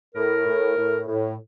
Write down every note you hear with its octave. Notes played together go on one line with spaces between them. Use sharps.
A2 A#4
A2
A2
A2